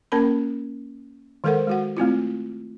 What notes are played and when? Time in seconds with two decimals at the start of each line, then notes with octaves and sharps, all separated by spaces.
0.12 A#3 C#4 A#4 A5 B5
1.44 D#3 G#3 A4 A#4 C5 F#5
1.67 G#3 F#4 F#5
1.97 A3 C4 E4 F4